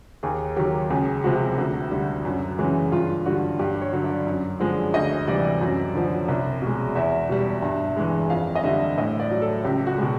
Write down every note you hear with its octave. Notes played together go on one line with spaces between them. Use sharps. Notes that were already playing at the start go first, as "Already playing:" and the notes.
D#2 G#4
D#3 F#3 G4
C#2 G#4
C3 F3 G#3 F#4
D2
D3 G3
F#2
C#3 E3 G#3
G2 F4
D3 G3 F#4
G2 G4
C#5
D3 F#3
D5
F#2
D3 F3 G#3
D2 D#5
C3 E3 G3 D5
F#2
D3 F3
C2
B2 G#3
E2 E5
B2 G3
G2
E3 G#3
F2 F5
D#5
D3 G3 E5
A2 D#5
D5
F#3
A4
C#2 G4
F#4
B2 G#3